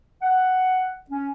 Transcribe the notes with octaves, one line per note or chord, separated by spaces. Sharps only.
F#5
C#4